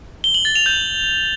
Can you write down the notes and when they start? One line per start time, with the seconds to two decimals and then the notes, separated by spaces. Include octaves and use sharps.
0.24 G7
0.34 F#7
0.45 A6
0.55 F7
0.66 G6